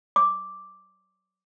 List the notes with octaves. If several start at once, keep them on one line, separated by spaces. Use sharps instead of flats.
D6